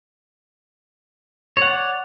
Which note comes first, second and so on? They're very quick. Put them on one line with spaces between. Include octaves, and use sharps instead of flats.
C#5 F#5 D5